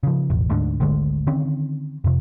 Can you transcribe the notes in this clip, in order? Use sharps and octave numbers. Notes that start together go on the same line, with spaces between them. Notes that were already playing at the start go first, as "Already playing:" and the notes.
C#3 F3
E1 A1
D2 G#2 D3
G#1 D2 D3 G#3
D3 D#3 C4 C#4
F2 C3